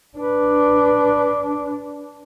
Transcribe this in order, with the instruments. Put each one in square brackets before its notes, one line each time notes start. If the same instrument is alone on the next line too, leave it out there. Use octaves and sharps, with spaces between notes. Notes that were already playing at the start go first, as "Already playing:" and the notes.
[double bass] D4 [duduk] B4